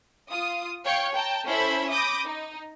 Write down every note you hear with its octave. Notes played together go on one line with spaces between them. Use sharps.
F4 D#6
C#5 F5 G5 C#6
G5 A5 A#5
C#4 E4 A4 C5 E5 B5
B5 D6 D#6 G6 A#6
D#4